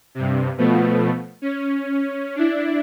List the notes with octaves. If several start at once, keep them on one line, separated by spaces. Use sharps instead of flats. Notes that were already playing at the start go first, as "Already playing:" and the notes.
G2 C3
B2 F3 A3 B3
C#4
D4 E4